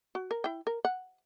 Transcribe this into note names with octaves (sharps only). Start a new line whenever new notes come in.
F#4
A#4
E4 G5
A#4
F#5